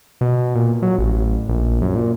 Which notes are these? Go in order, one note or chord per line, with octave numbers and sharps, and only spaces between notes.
B2
A#2
F#3
A1
A#1
F#2
A#2